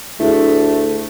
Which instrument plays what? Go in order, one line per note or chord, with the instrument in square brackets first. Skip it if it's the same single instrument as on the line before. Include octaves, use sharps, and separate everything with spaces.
[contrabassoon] D2 [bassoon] A3 [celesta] E4 G#4